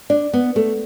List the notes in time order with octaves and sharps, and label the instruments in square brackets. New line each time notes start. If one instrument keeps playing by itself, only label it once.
[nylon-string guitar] D4 [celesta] D5
[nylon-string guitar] B3
[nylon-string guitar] A3 [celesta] A4